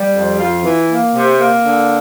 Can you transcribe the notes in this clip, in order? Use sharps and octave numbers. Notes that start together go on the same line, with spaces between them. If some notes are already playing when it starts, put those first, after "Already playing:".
Already playing: G3
F2
F4
E3
A#3
C3
A#3
D3